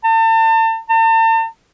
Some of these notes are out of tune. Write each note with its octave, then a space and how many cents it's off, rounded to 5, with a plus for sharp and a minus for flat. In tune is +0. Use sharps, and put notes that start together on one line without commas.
A5 +35
A5 +45